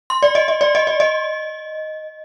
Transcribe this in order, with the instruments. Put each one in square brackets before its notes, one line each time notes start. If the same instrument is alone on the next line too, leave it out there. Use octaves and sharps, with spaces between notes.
[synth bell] C6
D5
D#5
D#5
D5
D#5
D5
D#5